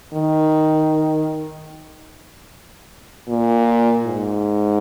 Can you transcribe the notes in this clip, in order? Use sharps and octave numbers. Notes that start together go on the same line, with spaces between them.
D#3
A#2
G#2